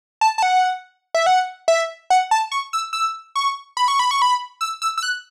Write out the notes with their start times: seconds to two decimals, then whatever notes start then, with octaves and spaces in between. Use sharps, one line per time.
0.21 A5
0.38 A5
0.43 F#5
1.14 E5
1.26 F#5
1.68 E5
2.10 F#5
2.31 A5
2.52 C#6
2.73 E6
2.93 E6
3.35 C#6
3.77 B5
3.88 C#6
3.99 B5
4.11 C#6
4.22 B5
4.61 E6
4.82 E6
4.98 E6
5.03 F#6